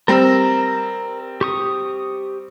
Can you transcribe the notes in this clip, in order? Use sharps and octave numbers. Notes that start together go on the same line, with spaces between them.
G3 C4 A#4 A#5 E6
G4 C#6 D#6